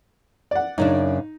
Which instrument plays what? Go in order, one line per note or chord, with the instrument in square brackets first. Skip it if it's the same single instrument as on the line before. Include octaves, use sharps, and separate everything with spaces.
[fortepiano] D5 F#5
[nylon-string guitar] F#2 C#3 D4 [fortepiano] D#4